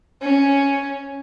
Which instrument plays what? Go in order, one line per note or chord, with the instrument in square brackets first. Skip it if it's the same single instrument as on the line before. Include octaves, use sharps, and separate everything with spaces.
[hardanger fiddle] C#4